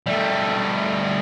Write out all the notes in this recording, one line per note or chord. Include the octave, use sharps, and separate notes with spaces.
G3 A3